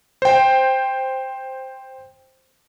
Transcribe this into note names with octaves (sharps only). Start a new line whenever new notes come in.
C5 G5